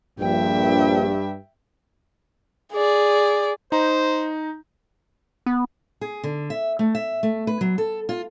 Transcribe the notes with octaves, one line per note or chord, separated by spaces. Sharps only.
A#1 G2 E5 G5
G#4 D5
D#4 C5 A#5
B3
G#4
D3
E5
A3
E5
A3
B4
F#3
A4
F4